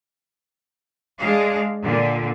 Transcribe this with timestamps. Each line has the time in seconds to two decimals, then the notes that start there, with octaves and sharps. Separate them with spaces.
1.19 G#3 D4 F5
1.83 A#2 D3